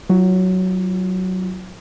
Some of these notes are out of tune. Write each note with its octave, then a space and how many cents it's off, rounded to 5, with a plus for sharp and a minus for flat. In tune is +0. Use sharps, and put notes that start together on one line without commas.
F#3 +5 F4 -35